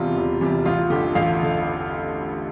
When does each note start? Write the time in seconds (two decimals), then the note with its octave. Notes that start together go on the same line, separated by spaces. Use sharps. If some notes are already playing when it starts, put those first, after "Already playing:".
Already playing: E1 E2 C3 G3 F4
0.17 E1
0.41 E2 C3 G3
0.65 A1 F4
0.90 G2 D3 G4
1.15 A1 F5
1.43 D3